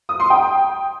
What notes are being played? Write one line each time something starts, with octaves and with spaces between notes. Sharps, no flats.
D#6
C6
G5